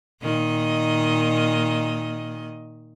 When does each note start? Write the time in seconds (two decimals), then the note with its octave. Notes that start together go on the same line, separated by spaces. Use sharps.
0.21 A#2 D#3 D#5